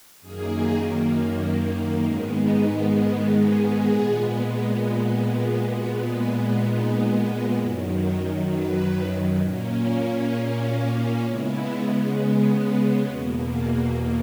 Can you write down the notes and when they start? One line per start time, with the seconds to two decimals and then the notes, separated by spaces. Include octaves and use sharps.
0.21 F#2 D#3 A#3 G#4
2.05 G#2 D#3 G#3 B3 G#4
2.36 A#4
2.66 B4
2.97 A#4
3.43 G#4
3.89 A#2 G#3 B3
5.72 A#2 G#3 B3 F#4
6.18 E4
6.64 D#4
7.56 F#2 D#3 F#3 E4
8.02 C#5
8.48 B4
9.40 A#2 A#3 C#4
10.31 G#4
10.62 F#4
10.93 D#4
11.24 C#3 G#3 B3 E4
13.07 E2 B2 A#3 F#4
13.54 G#4